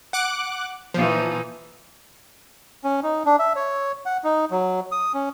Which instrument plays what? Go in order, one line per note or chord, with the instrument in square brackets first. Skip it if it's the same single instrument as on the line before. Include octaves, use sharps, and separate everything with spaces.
[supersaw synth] F#5 D6 F#6
[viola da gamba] A#2 E3 D#4 [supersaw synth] F3
[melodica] C#4
D#4
D4
E5
C#5
F#5
D#4
F#3
D#6
C#4